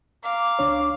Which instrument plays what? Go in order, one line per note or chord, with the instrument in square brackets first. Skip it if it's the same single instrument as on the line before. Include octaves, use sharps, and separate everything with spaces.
[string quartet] F5 [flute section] A#5 D6
[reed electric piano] C#2 D4 C#5